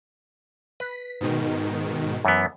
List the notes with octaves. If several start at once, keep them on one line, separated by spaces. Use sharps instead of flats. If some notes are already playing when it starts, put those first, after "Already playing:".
B4 B6
G#2 B2 D#3
F#2 E3 B3